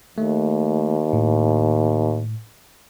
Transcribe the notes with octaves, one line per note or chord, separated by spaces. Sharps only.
D#2 A3
A2